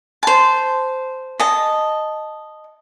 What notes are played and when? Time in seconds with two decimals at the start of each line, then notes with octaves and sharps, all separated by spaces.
0.23 C5 A5
1.40 D#5 A5